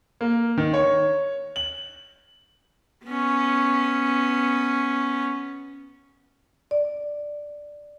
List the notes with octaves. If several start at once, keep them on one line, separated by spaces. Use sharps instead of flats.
A#3
D#3
C#5
F#7
B3 C#4
D5